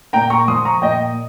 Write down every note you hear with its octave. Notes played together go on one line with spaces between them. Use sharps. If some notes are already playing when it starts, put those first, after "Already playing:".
A#2 G5 A#5
A#5 C#6
F3 C6 D#6
A#5 C#6
A#2 D#5 G5